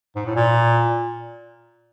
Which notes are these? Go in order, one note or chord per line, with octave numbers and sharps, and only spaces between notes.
G#2
A2
A#2